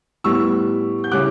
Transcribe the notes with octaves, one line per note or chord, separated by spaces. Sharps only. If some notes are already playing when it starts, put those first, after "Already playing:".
A2 G3 B3 C#6 E6
G6
C#3 G3 C#4 E4 D6 F#6